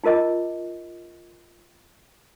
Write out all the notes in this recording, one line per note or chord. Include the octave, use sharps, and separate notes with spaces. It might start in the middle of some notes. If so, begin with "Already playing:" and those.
D#4 F4 A#4 D#5 D6